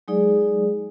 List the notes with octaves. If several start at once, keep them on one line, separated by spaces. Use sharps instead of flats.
F#3 G#3 D#4 G#4 D5